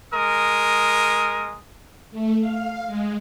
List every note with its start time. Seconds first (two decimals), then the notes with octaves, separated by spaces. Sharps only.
0.13 G#3 A#4 D#6
2.11 A3
2.40 F5
2.87 G#3